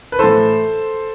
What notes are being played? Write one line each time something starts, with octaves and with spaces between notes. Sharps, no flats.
B4
A2 E3 A4 C5